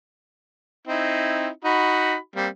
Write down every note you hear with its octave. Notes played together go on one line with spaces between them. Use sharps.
C4 D#4 E4
D#4 F#4 B5
G3 A#3 C4